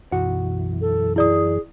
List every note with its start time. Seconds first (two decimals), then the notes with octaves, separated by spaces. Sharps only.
0.12 B1 F#2 E3 F#4 F#5
0.81 A4
1.16 E4 G#4 D5 D#6